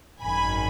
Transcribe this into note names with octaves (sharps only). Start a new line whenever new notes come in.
G#1 F#2 D#3 G#5 B5